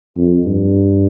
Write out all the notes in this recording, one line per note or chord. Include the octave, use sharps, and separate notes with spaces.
F2
G2